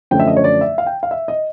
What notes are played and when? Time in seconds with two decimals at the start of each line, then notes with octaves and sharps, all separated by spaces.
0.11 F#2 D3 F3 A3 G5
0.20 E5
0.27 D#5
0.37 C#5
0.44 D5
0.61 E5
0.78 F5
0.86 G5
1.03 F5
1.11 E5
1.28 D#5